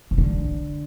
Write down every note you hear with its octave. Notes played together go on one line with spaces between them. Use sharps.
C3
D3